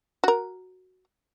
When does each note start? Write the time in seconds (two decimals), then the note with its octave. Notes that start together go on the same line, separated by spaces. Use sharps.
0.24 F#4 A#4